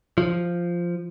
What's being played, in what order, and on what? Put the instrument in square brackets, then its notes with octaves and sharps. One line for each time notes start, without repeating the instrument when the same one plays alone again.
[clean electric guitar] F3